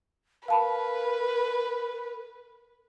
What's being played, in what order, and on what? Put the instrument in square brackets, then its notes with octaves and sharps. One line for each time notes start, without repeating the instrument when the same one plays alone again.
[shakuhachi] A#4 [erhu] B4 [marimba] F5 A5 B5